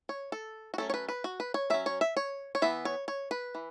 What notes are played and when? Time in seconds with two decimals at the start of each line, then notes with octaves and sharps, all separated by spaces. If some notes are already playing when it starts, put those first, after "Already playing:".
0.09 C#5
0.32 A4
0.74 F#4
0.78 F#3 A3 C#4 A4
0.90 C#5
0.94 B4
1.09 B4
1.24 F#4
1.40 B4
1.54 C#5
1.70 F#3 C#4 E5
1.86 C#5
2.01 E5
2.17 C#5
2.55 C#5
2.62 E3 B3 E5
2.85 C#5
3.08 C#5
3.31 B4
3.55 E3